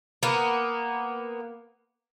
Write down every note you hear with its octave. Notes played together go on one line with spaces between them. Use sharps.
A#3 B3